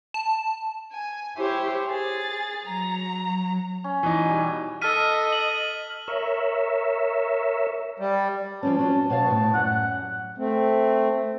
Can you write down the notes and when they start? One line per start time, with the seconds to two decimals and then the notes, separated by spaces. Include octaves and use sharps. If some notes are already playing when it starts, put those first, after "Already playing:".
0.14 A5
0.91 G#5
1.37 E4 G4 C5 C#5
1.88 G#4 A6
2.63 F#3 A#5
3.84 C#4
4.03 E3 D#4
4.25 B2 G3
4.82 A4 D#5 F6 B6 D#7
5.33 F#7
6.08 A#4 C#5 E5
7.99 G3
8.63 F3 G3 C#4 A5
8.78 F#3 B3 C#4
9.10 B2 C#5 F5
9.26 A2 B3
9.54 F#2 G3 F#5
10.38 A3 C4